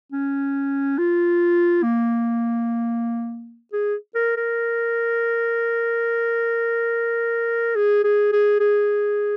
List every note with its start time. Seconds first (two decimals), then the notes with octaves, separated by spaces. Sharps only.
0.12 C#4
0.98 F4
1.83 A#3
3.73 G#4
4.15 A#4
4.37 A#4
7.75 G#4
8.04 G#4
8.32 G#4
8.60 G#4